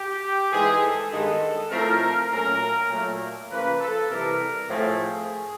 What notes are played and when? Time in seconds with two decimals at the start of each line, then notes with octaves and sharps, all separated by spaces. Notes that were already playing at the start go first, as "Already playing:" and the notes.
Already playing: G4
0.51 G#2 E3 G#3 G#4
0.81 A4
1.11 G2 D#3 G#3 B3
1.70 A2 F3 A3 C4 A#4
2.31 A#2 F#3 A3 C#4 A#4
2.90 A#2 F#3 A3
3.50 C#3 F3 A#3 B4
3.80 A4
4.10 C3 E3 G3 A#4
4.70 A2 F3 A3 C4 G#4